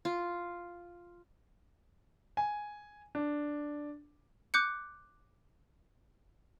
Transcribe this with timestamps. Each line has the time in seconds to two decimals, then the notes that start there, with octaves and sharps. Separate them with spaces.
0.05 F4
2.37 G#5
3.15 D4
4.54 D6 F#6 G6 C#7